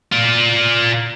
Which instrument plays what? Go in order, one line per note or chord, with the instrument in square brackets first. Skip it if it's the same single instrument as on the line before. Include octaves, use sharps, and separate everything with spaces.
[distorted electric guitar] F4 D5